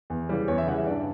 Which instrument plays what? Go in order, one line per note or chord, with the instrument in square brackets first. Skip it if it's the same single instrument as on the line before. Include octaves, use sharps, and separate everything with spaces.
[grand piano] E2
C#3 E3 G3
E2 C#5
E5
C#3 E3 G3 F#5
E5
G2 D5